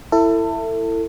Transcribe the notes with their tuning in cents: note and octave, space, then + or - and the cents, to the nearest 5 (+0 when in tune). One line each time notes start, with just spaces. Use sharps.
E4 +10 A4 +30